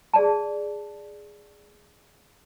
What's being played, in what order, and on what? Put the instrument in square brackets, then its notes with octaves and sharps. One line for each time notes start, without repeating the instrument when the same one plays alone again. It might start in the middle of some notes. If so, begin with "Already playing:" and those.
[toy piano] G#4 D5 A5